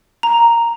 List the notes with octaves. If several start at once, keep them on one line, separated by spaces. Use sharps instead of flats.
A#5